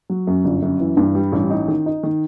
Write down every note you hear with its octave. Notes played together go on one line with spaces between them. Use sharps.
F#3
F#2
G1
F#2
E3
G2
G3
A1
D#4
D#3
D#4
D#3